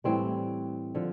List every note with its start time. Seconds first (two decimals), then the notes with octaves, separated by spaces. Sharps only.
0.04 A2 E3 G3 C4
0.95 D3 F3